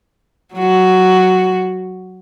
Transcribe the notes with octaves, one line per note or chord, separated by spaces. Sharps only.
F#3 F#4